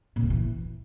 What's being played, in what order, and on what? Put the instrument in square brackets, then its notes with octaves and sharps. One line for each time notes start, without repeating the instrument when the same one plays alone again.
[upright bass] A#2
G2
E3